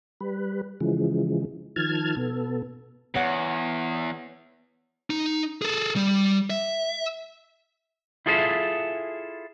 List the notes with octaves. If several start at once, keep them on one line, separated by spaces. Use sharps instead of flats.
G3 B4
C#3 E3 F3 G#3
D#3 F3 A5 F6 G#6
B2 B3 A4
E2 B3 C#5 F#5
D#4
G#4 A4
G3
E5
E4 F4 G#4 A4 C5 E5